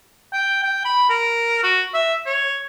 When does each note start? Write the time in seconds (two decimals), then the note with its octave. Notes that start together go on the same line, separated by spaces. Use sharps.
0.33 G5
0.63 G5
0.85 B5
1.10 A#4
1.63 F#4
1.94 E5
2.26 C#5